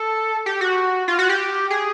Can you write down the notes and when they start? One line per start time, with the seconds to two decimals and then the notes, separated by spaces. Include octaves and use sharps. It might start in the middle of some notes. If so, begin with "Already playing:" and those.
Already playing: A4
0.46 G4
0.61 F#4
1.08 F4
1.19 F#4
1.29 G4
1.70 G#4